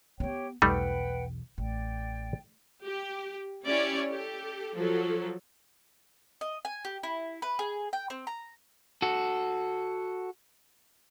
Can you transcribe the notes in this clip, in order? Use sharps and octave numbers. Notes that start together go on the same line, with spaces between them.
B3 C4 G4 C#5 G5
B1 E2 G3 A3 D#4 B4 F#5 G5
A1 D5 G5
G4
C#4 E4 G4 C#5 D5
G4 A4
F3 F#3 A4
D#5
G#5
G4
E4
B4
G#4
G5
C4
A#5
F#4 A4